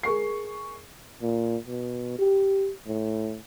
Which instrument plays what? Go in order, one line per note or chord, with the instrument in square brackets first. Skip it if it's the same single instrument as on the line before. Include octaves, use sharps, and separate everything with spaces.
[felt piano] G#4 A#4 C#6 C7
[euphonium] A#2
B2
G4
A2